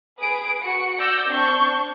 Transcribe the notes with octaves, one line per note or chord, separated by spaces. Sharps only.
G#4 B4 D#6 D7
F#4 C#7
D5 E6 G6 A#6
C4 D4 C#6 G6